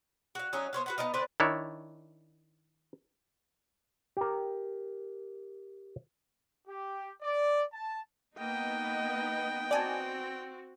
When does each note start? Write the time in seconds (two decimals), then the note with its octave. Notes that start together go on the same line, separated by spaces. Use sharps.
0.35 F#4 F5
0.53 F#3 C#4 D#4
0.73 B3 C5 C#5 F5
0.86 F#4 B4 F#5
0.98 B3 D#4 D#5 F5
1.14 D3 C4 B4 D5
1.40 D#3 D4 E4 C#5
4.17 G4 A#4
6.67 G4
7.22 D5
7.72 A5
8.38 A#3 B3 D#4 D#5 G5
9.71 C4 F#4 D5 G#5 A5